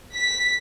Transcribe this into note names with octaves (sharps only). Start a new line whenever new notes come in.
B6